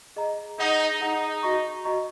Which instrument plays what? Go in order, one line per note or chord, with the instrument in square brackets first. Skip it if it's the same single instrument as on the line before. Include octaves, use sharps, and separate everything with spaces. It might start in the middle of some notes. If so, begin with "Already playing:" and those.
[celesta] G#4 D#5 A#5
[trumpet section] D#4 [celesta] G#4 F#5 A#5
[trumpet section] D#4 [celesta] G#4 F#5 A#5
[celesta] F#4 D#5 A#5 C#6
F#4 D#5 A#5 C#6